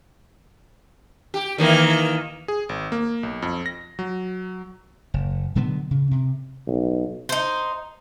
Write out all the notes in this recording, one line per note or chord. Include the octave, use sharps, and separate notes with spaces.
G4
D#3 E3 A#3
G#4
G#1
A#3
B1
F2
A#6
F#3
F#1
B2 D3 F#3 B3
C#3
C3
B1
D#4 C5